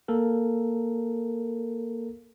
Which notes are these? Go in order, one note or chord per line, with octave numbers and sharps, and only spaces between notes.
A#3 A4 A#4